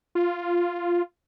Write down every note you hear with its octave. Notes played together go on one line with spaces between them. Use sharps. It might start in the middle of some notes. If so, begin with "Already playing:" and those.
F4